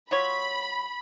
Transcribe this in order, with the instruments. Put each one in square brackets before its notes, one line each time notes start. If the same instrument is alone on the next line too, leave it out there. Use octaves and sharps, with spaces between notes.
[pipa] F#3 F4 C#5 [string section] B5